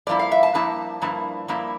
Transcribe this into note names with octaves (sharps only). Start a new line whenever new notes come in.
G2 F3 A#3 E4 D5
F5
E5
A5
G2 F3 A#3 E4 A5
G2 F3 A#3 E4
G2 F3 A#3 E4